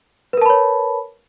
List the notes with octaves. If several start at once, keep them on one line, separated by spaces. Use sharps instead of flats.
A#4 B4 C#5 A5 B5